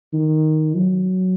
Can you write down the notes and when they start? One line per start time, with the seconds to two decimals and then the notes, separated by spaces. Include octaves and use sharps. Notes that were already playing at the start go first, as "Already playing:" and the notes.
0.13 D#3
0.75 F#3